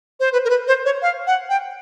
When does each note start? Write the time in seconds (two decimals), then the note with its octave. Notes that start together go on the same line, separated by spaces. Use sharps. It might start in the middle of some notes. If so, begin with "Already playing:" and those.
0.20 C5
0.32 B4
0.45 A#4
0.50 B4
0.67 C5
0.85 C#5
1.02 F5
1.27 F#5
1.49 G5